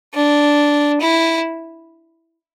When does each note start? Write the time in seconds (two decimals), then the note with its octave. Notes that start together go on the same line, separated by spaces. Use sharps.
0.14 D4
1.01 E4